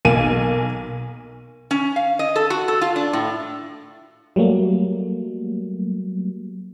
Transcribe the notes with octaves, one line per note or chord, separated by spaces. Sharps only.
B1 A#3 G#5 D#7
C#4
F5
D#5
A4
F#4
A4
F4
D4
A2
F#3 G3 A3 A#3